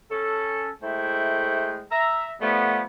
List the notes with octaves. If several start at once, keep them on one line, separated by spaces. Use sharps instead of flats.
C#4 A4
G#3 A3 E4 C5 G5
E5 A#5
F3 G3 A3 B3